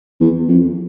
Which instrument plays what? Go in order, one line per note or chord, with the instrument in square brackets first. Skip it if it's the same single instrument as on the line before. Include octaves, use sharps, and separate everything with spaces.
[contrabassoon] E2
F2